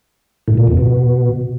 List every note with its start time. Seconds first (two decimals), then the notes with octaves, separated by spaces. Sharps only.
0.48 A2
0.57 A#2
0.67 F2
0.77 B2